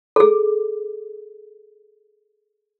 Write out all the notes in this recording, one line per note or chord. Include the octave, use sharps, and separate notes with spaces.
G#4 A4